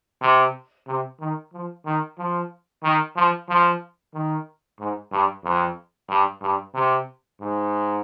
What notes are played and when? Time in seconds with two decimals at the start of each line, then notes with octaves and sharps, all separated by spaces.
0.21 C3
0.87 C3
1.20 D#3
1.53 F3
1.85 D#3
2.18 F3
2.83 D#3
3.16 F3
3.49 F3
4.13 D#3
4.79 G#2
5.11 G2
5.44 F2
6.09 G2
6.42 G2
6.74 C3
7.40 G#2